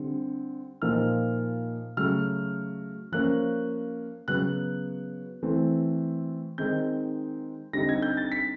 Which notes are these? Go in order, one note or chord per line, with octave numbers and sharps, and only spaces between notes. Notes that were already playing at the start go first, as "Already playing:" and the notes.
Already playing: D3 G3 C4
A#2 F3 A#3 D#4 F6
C#3 F#3 A3 F6
F3 A#3 C#4 F#6
C#3 F#3 B3 F#6
E3 A3 C4
D#3 G#3 C4 D#4 G6
D3 G3 C4 D#4 A#6
G#6
G6
A6
B6